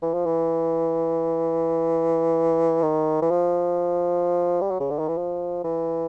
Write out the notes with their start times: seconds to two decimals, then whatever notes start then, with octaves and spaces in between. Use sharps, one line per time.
0.02 E3
0.14 F3
0.26 E3
2.82 D#3
3.22 E3
3.30 F3
4.61 G3
4.71 F#3
4.80 C#3
4.91 D3
4.99 D#3
5.08 E3
5.18 F3
5.64 E3